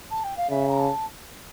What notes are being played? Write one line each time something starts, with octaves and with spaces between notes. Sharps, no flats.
A5
G5
F5
C#3 E5
A#5
A5